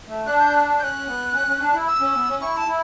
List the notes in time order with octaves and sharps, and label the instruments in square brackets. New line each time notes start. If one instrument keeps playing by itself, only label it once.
[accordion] A3
[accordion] D4 [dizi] F#6
[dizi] G6
F#6
[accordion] C#4 [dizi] F#6 G6
[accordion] B3
C#4
C#4
D4
E4
[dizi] E6
[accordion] C#4
B3
C#4
[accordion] E4 [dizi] C#6
[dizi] A5
[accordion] E4